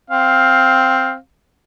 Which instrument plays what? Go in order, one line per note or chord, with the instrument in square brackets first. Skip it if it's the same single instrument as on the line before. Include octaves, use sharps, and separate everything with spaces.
[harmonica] C4 F5